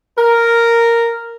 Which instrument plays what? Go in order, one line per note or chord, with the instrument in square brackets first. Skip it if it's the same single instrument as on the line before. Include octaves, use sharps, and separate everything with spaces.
[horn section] A#4